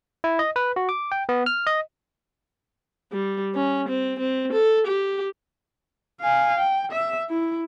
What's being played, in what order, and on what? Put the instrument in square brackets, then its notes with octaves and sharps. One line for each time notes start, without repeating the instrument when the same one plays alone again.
[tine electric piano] E4
D#5
B4
F#4
D6
G5
B3
F6
D#5
[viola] G3
C#4
C4
C4
A4
G4
[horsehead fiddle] F5 G#5
G5
E5
E4